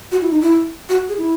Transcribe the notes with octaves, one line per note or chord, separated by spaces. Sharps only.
F#4
E4
D#4
E4
F#4
G#4
E4